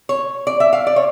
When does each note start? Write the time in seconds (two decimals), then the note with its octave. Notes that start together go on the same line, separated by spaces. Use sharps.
0.09 C#5
0.47 D5
0.60 E5
0.73 F5
0.87 D5
0.96 C#5